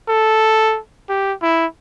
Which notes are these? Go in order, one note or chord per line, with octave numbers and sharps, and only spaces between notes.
A4
G4
E4